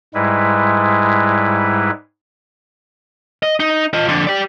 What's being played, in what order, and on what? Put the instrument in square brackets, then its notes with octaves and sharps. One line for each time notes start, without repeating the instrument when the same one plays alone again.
[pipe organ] G#2 G3 G#3 E4 B4
[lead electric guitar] D#5
D#4
F4 D#5
F2 D3
G4 D5